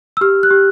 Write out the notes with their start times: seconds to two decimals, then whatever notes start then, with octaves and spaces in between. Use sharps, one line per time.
0.17 E6
0.21 G4 F6
0.43 F#6
0.51 G4